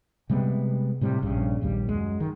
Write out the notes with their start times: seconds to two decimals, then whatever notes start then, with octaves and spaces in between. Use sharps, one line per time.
0.30 C3 G3 G#3 B3
1.01 A2 C3 G3
1.22 A#1 G2 C#3
1.61 A#1 D#2 G3
1.88 F#2 G#3
2.20 D#3